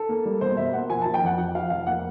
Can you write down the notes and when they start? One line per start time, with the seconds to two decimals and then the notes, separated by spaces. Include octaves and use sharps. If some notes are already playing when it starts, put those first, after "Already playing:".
Already playing: A4
0.09 A#3
0.25 G3
0.41 B2 C5
0.57 B2 E5
0.73 A#3 F#5
0.90 F3 G#5
1.02 F3 A5
1.14 G5
1.22 F2 F#5
1.38 F3 F#5
1.55 F3 F5
1.70 F1 F5
1.86 A#3 F#5